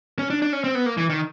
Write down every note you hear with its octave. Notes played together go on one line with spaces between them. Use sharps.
C#4
D4
D4
C#4
C4
B3
A#3
E3
D#3